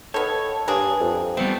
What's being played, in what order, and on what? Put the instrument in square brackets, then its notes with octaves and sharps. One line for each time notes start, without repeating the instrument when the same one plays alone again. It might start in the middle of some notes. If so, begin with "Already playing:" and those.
[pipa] D#3 B3 [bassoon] A4 [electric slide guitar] C#5
[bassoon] G2 [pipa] A#3 D4 G#4
[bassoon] F2
[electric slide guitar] G3 B3 C4 [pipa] A3